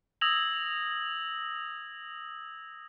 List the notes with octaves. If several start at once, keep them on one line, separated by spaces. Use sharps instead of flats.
D#6 E6 G#6 A#6 F7 F#7